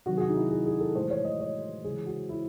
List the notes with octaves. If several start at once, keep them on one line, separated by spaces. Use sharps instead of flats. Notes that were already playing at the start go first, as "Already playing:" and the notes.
C3 D#3 F#3 F#4
G#4
F#4
D#4
E4
G#4
G#4
A4
A2 E3 G#3 C5
C#5
D#5
C#5
C#3 E3 G#3 G#4
F#4
E4